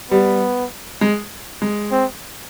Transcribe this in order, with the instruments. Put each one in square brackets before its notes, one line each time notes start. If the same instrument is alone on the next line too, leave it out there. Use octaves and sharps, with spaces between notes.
[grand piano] G3 [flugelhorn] B3
[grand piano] G#3
G#3
[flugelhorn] C4